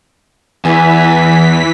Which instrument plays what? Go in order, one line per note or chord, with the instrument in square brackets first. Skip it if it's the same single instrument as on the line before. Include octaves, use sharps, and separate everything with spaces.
[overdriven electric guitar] E2 [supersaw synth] E3 B6 [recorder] G#5